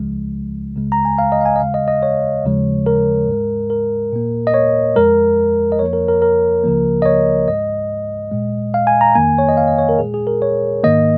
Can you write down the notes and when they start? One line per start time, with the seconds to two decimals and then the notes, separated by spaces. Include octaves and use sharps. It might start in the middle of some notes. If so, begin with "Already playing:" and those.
Already playing: C#2 C#3 F3 G#3
0.76 C#2 C#3 G#3
0.92 A#5
1.05 G#5
1.18 F5
1.32 D#5
1.41 F5
1.46 G#5
1.56 D#5
1.60 D#2 C#3 G#3 F5
1.74 D#5
1.88 D#5
2.03 C#5
2.45 D#2 C#3 F3 G#3
2.86 A#4
3.28 G#2 G#3
3.70 A#4
4.13 A#2 A#3
4.47 D#5
4.54 C#5
4.96 F2 F3 G#3 A#4
5.72 D#5
5.79 F2 F3 A#3 C#5
5.93 A#4
6.08 A#4
6.22 A#4
6.64 C#2 C#3 F3 A#3
7.02 D#5
7.06 C#5
7.48 G#2 G#3 D#5
8.31 A#2 G#3
8.74 F5
8.87 G#5
9.01 A#5
9.15 F2 D#3 A#3 G#5
9.38 C#5
9.49 D#5
9.57 F5
9.68 D#5
9.78 C#5
9.89 A#4
9.99 A#2 G#3 G#4
10.14 G#4
10.27 A#4
10.42 C#5
10.84 G#2 D#3 A#3 D#5